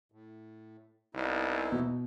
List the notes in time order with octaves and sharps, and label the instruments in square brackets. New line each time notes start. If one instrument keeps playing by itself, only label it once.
[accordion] A2
[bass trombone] C2 [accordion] B3 D#4 E4
[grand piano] B2